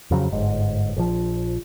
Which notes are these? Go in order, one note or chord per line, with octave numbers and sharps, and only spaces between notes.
F2 C#3 F#3
G1 G#2
A#1 F3